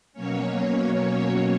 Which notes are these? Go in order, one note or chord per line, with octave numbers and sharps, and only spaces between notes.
B2 F#3 A#3 C#4 C#5